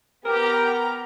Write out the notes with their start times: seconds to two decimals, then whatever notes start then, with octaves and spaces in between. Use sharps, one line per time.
0.25 B3 G4 A#4 A#5